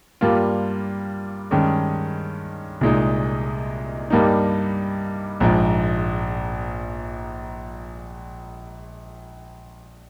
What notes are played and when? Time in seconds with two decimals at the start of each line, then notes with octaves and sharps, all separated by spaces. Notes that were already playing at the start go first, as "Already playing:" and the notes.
0.21 G2 G3 A#3 F4
1.51 G2 D#3 G#3 C#4
2.81 C2 A#2 G#3 D#4
4.10 G2 G3 A#3 D#4
5.40 A#1 G#2 F3